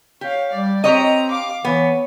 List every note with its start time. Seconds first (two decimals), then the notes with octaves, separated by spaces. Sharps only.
0.21 G4 C#5 F5
0.53 G3 D5
0.84 C4 G4 C#5 D#5 A#5
1.31 F5 D6
1.65 E3 B3 C#5